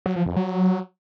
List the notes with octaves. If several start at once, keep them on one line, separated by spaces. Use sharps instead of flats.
F#3
F3
F2
F#3